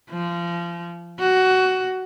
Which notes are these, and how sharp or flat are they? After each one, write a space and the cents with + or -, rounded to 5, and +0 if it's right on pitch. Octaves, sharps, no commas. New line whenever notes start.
F3 -25
F#4 +15